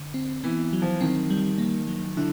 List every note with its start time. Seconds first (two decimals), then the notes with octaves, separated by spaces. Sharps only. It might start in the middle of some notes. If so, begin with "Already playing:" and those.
Already playing: D3
0.14 C4
0.44 E3 B3
0.73 F#3
0.82 F3
1.01 D#3 C4
1.30 G3
1.58 A#3
1.87 F#3
2.17 D3 E4